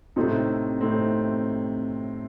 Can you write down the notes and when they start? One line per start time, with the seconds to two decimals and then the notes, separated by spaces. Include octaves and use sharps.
0.16 A2 C3 A3 C4 D#4
0.81 A2 A3 C4 D#4